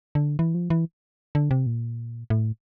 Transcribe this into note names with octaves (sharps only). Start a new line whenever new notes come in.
D3
E3
F3
E3
D3
C3
A#2
A2